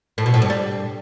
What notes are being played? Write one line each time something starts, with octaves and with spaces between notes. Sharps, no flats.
A2
B2
A2
G2
G3